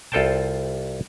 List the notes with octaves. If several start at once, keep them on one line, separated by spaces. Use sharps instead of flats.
C2 F4 A4 C5 G5 A5